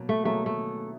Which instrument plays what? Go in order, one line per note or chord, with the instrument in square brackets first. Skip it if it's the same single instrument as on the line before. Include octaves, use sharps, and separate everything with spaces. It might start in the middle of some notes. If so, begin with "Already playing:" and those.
Already playing: [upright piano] B2 F#3 A#3
[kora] A3
[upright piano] B2 F#3 A#3 D#4 G#4 [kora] A3
[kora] A3